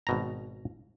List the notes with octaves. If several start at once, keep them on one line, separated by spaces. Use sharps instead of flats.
G#1 B2 A#5